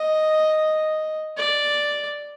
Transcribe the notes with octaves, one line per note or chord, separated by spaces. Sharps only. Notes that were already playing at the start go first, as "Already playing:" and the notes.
Already playing: D#5
D5